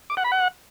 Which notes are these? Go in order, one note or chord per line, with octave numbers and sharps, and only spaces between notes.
D6
F#5
B5
F#5